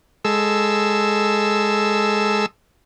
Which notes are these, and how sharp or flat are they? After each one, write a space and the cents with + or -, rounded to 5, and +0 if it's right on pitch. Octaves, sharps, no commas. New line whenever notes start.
G#3 +0 A4 -5 E6 +0